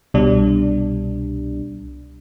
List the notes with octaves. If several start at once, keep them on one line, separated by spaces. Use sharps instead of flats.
C2 B2 G3 D4